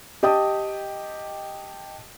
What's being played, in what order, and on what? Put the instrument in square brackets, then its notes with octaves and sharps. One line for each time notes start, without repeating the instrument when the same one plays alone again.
[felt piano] G4 D#5 G5 A5 D#6